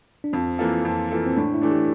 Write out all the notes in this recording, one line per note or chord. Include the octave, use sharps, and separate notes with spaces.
D4
F2 C4
E3 A#3 F4 A4
F2
E3 A#3 F4 A4
C4
A2 D4
E4
E3 A3 D4
G4